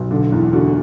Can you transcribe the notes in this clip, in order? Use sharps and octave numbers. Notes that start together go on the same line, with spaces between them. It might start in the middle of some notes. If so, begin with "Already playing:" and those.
Already playing: B1
D3
E2
D3 F#4